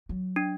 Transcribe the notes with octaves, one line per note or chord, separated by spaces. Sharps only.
F#3
D4